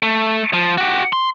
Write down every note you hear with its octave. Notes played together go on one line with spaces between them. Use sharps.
A3
F3
F#4 G4
C6